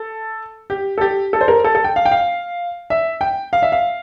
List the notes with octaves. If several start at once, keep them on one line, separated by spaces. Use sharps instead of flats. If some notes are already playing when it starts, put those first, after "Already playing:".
Already playing: A4
G4
A4
G4
A4
C5
A#4
A4
A4
G5
F5
G5
F5
E5
G5
F5
E5
F5